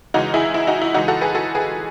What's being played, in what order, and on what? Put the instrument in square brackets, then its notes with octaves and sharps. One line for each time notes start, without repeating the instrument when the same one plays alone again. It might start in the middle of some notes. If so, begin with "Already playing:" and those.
[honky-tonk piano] C#3 E3 G#3 D#4 F#4
E4 G#4
E4
D#4 F#4
E4
C#3 E3 G#3 D#4 F#4
F#4 A4
G#4 B4
F#4 A4
G#4 B4